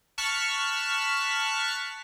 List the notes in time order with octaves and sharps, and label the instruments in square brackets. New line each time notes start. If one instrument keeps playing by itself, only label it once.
[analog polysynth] A5 C#6 F6 F#6 B6